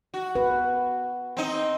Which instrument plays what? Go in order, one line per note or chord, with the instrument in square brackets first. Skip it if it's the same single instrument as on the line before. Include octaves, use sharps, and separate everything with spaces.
[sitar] F#4
[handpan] B4
[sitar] C4 D#4